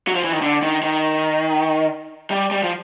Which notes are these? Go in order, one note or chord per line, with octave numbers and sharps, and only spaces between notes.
F#3
F3
E3
D#3
D3
D#3
D#3
G3
G3
F3